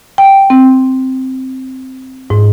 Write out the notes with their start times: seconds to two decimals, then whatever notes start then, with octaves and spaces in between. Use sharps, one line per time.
0.18 G5
0.50 C4
2.30 G#2